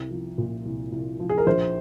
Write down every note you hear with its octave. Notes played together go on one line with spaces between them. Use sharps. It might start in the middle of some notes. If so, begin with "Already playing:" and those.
Already playing: C2
F3
A#2
C2
C2
F3
G#4
A#4
A#1 C5